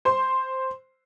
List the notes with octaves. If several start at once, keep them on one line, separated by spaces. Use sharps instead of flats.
C5 C6